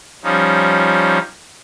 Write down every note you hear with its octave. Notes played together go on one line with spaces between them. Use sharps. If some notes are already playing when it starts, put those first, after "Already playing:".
F3 G3 C#4 D#4